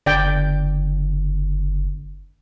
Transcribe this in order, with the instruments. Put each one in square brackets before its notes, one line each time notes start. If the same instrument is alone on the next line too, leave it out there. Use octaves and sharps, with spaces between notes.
[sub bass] F#1 [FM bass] D3 [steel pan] D5 G5